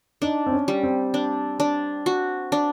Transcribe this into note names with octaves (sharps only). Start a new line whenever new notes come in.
D4 D#4
C4
C#4
G3
C4
D4
D4
F#4
D4